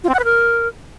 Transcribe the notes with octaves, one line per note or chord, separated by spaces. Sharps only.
F4
C4
F#5
B4
A#4